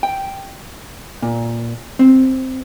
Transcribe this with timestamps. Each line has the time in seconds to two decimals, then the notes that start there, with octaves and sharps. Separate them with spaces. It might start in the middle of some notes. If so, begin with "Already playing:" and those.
0.03 G5
1.22 A#2
1.99 C4